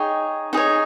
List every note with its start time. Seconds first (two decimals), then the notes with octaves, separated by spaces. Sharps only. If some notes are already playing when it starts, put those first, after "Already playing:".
Already playing: D#4 G#4 C#5 G5
0.53 D#4 G#4 C#5